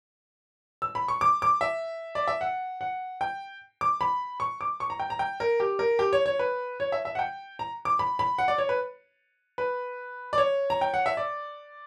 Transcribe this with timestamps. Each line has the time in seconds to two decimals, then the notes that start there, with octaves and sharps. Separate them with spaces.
0.82 E6
0.95 B5
1.08 C#6
1.21 D6
1.42 D6
1.61 E5
2.15 D5
2.28 E5
2.41 F#5
2.81 F#5
3.21 G5
3.81 D6
4.01 B5
4.40 C#6
4.61 D6
4.80 C#6
4.90 A#5
5.00 G5
5.10 A#5
5.19 G5
5.40 A#4
5.60 G4
5.79 A#4
5.99 G4
6.13 C#5
6.26 C#5
6.39 B4
6.80 C#5
6.92 E5
7.05 E5
7.15 F#5
7.19 G5
7.59 A#5
7.85 D6
7.99 B5
8.19 B5
8.38 F#5
8.48 D5
8.58 C#5
8.69 B4
9.58 B4
10.33 D5
10.38 C#5
10.70 A#5
10.81 G5
10.94 F#5
11.06 E5
11.17 D5